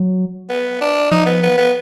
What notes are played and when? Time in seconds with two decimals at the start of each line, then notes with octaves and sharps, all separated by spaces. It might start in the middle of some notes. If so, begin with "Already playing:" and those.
Already playing: F#3
0.49 B3
0.81 D4
1.11 F3 D#4
1.26 B3
1.42 B3
1.58 B3